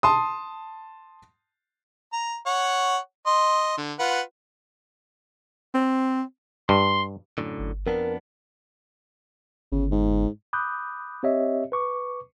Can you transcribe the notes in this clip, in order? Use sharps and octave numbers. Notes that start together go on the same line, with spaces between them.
A5 C6 D#6
A#5
C#5 F#5
D#5 C6
D3
F4 B4 F#5
C4
G2 C6
F#2 A2 D3
G1
F2 B3 D4 A#4
G1 C#3
G#2
B5 D6 D#6 F#6 G6
C4 G4 C#5 D#5 E5
B4 C#6 D6